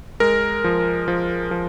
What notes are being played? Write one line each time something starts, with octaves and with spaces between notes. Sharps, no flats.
G#3 A#4
F3
F3
F3